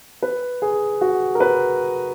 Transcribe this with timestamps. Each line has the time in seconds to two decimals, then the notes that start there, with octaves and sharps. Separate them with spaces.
0.22 B4
0.62 G#4
1.01 F#4
1.35 A#4
1.40 B4